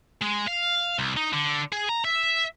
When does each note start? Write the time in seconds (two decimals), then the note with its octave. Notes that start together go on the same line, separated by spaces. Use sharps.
0.21 G#3
0.47 F5
0.99 C2
1.17 D#4
1.33 D3
1.72 G#4
1.89 A#5
2.05 E5